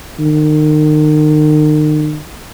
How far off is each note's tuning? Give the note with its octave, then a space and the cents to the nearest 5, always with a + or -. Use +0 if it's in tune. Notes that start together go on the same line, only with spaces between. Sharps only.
D#3 -35